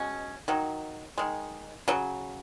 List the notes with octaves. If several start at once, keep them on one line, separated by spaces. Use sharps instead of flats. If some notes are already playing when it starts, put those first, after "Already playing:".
Already playing: B2 G#3 C#4
D#3 F#3
D#3 G#3
C#3 F#3